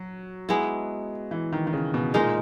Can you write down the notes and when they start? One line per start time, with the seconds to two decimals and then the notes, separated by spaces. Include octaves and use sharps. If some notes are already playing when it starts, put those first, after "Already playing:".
Already playing: F#3
0.49 G#3 B3 E4
1.31 E3
1.53 D#3
1.67 D#3
1.73 C#3
1.94 B2
2.14 A#2 G#3 D#4 A#4